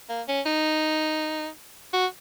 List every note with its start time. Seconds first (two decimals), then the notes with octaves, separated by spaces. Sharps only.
0.09 A#3
0.28 C#4
0.46 D#4
1.93 F#4